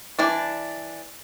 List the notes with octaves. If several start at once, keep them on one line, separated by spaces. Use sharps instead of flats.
E3 D4 D5